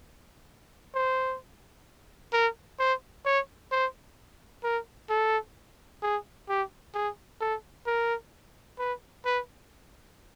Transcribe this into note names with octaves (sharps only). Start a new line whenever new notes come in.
C5
A#4
C5
C#5
C5
A#4
A4
G#4
G4
G#4
A4
A#4
B4
B4